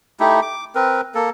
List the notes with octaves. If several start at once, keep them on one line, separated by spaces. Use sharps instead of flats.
A3 D#4 E4 G4
D6
C4 A#4 B4
A#3 A4